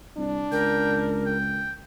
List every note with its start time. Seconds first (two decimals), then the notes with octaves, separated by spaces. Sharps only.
0.17 C2 D4
0.52 C#2 A#4 G5
1.26 G5